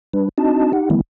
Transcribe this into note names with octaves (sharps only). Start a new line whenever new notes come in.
G3 D4 B4
C4 D4 D#4 F#4 D#5 A5
D#4 G4 F#5
D#3 E3 G3 A3 B3 E4